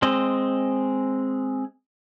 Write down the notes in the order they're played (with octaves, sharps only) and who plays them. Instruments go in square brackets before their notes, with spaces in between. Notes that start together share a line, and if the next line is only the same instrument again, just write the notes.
[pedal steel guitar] G#3 C4 D#5